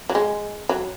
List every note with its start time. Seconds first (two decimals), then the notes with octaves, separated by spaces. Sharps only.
0.09 F#3
0.15 G#3
0.69 F#3